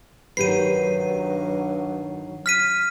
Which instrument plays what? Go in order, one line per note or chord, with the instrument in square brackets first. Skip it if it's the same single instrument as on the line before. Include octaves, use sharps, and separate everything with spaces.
[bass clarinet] G2 [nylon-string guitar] D#3 G4 B4 [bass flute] F#3 [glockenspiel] C7 D#7
[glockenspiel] F6 B6 D#7